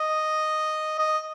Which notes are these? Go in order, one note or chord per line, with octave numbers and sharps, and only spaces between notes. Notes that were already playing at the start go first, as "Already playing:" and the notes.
Already playing: D#5
D#5